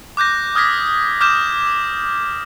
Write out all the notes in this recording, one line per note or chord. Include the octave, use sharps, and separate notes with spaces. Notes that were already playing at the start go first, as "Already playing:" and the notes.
D6 F#6 G6 A#6
D#6 F6 G#6 A#6 B6
D6 F6 G6 A#6 E7
D#6